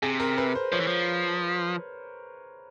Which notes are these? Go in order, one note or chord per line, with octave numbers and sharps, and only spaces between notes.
C3 G#4
A#4
B4
C5
F3 C#5
E3
F3